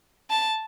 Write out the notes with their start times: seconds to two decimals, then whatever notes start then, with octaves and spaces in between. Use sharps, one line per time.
0.30 A5